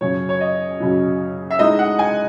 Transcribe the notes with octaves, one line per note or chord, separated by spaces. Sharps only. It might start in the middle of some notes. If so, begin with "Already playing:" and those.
F#2 C#3 F#3 C#5
C#5
D#5
F#2 C#3 F#3
E5
A2 G#3 D#4 D#5
F#5
G#5